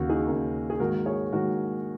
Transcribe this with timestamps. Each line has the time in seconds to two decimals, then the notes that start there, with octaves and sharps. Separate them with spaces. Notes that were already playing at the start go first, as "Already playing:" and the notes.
Already playing: D#2 C#3 A#3 F#4
0.09 D#4 G#4
0.27 D#2 C#3 A#3
0.70 G#4
0.80 G#2 D#3 A#3 F#4 A#4
1.06 G#4 C#5
1.32 G#2 D#3 A#3 F#4 A#4